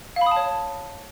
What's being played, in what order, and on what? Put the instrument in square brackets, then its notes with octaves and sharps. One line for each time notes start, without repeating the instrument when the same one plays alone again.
[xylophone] F5
B5
D#6
A5
C#5